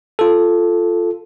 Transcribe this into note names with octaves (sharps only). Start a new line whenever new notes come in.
F4 A4